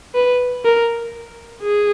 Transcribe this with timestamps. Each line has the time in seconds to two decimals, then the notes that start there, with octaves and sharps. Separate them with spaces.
0.15 B4
0.65 A#4
1.62 G#4